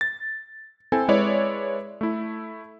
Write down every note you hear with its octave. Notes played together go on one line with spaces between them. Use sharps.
A6
C4 E4 A4 G#5
G#3 E4 B4 C#5 D5
A3 E4